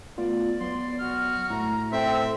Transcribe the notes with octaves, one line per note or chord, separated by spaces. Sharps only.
A3 B3 F4 D5
F#3 B3 C6
F#4 F6
A2 A3 A#5
C4 A4 E5